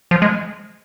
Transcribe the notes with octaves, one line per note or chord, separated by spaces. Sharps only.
F3
G#3